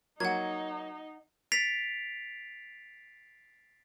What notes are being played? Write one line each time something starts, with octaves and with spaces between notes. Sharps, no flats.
F#3 A#3 D#4 F#5 G#6
A6 B6 C7 D7 F7